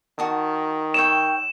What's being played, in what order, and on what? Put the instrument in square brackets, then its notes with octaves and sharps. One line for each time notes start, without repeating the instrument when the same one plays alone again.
[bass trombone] D#3 [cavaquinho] F#4 A5 D#6
[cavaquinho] C#5 E5 G5 [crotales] E7